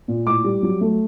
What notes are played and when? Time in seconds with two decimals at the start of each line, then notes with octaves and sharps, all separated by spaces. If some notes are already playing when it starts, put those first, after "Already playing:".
0.08 A#2
0.27 A2 D6
0.44 G3
0.63 F#3
0.81 A3